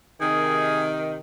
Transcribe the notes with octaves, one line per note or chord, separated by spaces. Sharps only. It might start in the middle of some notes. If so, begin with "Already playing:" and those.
C3 D#3 G#4